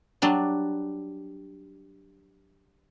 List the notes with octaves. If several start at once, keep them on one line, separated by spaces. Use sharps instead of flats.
F#3 G3 D4